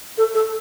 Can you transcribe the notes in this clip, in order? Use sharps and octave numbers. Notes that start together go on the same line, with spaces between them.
A4
A4